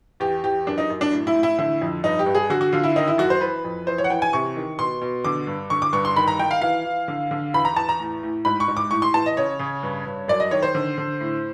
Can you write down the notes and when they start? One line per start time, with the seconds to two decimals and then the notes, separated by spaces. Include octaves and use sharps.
0.20 E2 G4
0.43 E2 G4
0.67 F#2 D4
0.78 D#4
0.90 F#2
1.01 D4
1.12 A2
1.27 E4
1.35 A2
1.43 E4
1.58 D3 E4
1.81 F2
2.03 G2 D#4
2.19 G4
2.26 G2
2.35 G#4
2.50 D3 F#4
2.61 F#4
2.72 D3 F4
2.84 E4
2.96 D#3 D#4
3.08 E4
3.18 F#2 F#4
3.30 C5
3.41 E3 B4
3.64 F2
3.87 E3 C5
3.98 C#5
4.04 F#5
4.10 E3 G5
4.22 G#5
4.33 C3 C#6
4.56 D#3
4.79 B2 C6
5.01 B2
5.25 D3 D6
5.47 G2
5.70 D3 C#6
5.82 D6
5.93 G2 C#6
6.05 C6
6.16 D#3 B5
6.28 A#5
6.39 D#3 G5
6.51 F5
6.62 E3 F5
6.85 E3
7.08 D3
7.31 D3
7.54 E2 B5
7.65 A#5
7.76 E2 A5
7.89 A#5
8.00 A2
8.23 A2
8.45 G#2 B5
8.60 C#6
8.68 G#2
8.77 D6
8.91 A2 C#6
9.02 C6
9.14 E3 A5
9.26 D#5
9.37 C#3 C#5
9.59 C#3
9.83 G2
10.06 G2
10.28 F#2 D5
10.40 D#5
10.51 D#3 C#5
10.63 C5
10.75 D3
10.98 D3
11.21 A2